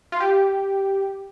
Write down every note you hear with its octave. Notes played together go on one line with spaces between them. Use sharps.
F4
G4